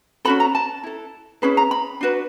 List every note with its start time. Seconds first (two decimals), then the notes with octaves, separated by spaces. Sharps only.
0.25 C#4 F#4 A4 B5
0.40 A#5
0.55 A5
0.84 E4 A4
1.42 C#4 E4 G#4 B4 B5
1.57 A#5
1.71 B5
2.01 D4 F#4 B4